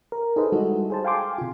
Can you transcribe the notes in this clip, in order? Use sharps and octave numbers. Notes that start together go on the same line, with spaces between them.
A#4
D#4 G#4 A4 B4 C5 D#5
G3 G#3 D#4 E4 F#4 A4
G#4 C5 A5
F5 G5 G#5 C6 D6
C3 F4